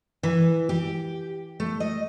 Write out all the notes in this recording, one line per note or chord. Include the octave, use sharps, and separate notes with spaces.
E3
G4
A3
D#5